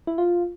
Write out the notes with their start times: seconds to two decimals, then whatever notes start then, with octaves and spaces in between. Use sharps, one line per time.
0.07 E4
0.18 F4